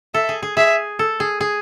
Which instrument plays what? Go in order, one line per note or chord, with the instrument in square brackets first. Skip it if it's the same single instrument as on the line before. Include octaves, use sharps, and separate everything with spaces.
[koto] A4 [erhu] E5
[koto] G#4
G#4
[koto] G#4 [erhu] E5
[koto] A4
G#4
G#4